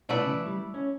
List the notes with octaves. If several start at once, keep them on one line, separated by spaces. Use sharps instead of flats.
B2 A3 E4 B4 D5
C#3
E3
G3
C#4